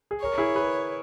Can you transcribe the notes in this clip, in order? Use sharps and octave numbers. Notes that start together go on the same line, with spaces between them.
G#4
A#4 C#5
E4 G#4
G#4 B4